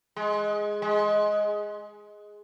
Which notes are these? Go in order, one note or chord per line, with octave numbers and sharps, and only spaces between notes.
G#3
G#3